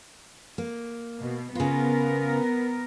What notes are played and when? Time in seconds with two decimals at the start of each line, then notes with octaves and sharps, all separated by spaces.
0.58 A#3
1.20 B2
1.55 C#3 B3 F4 A#4